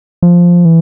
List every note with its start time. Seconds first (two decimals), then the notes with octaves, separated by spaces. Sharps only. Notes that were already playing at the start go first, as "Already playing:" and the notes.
0.22 F3
0.65 E3